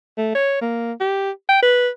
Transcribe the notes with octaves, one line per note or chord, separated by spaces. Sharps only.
A3
C#5
A#3
G4
G5
B4